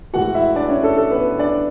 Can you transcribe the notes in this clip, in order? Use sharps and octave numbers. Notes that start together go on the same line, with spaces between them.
A2 E3 G#3 B3 F#4 F#5
E4 E5
D4 D5
C#4 C#5
A4
A4
B3 B4
D4 D5